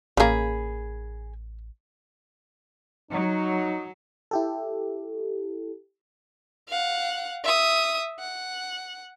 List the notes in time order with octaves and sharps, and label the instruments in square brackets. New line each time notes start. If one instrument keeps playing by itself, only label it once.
[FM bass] A1 [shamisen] C#3 A#3 [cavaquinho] G#4 B5
[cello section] F#3 [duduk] D#4
[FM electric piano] E4 G4 A4
[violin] F5 F#5
E5 D#6
F#5